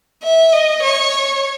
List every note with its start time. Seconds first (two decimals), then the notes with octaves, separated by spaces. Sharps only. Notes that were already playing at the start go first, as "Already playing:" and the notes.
0.23 E5
0.53 D#5
0.83 C#5